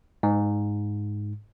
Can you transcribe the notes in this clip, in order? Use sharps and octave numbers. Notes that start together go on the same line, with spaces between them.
G#2